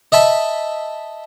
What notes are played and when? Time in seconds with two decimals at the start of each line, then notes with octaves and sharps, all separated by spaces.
0.12 D#5 E5 A5 B5